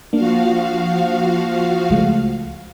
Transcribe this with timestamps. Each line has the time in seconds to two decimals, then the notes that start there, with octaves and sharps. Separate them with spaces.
0.13 F3 A#3 D4 F#4 F5
1.90 C#2 G#3 A3